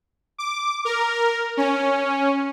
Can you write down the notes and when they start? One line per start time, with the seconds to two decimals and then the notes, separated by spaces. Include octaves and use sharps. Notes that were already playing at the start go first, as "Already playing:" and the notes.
0.38 D6
0.85 A#4
1.57 C#4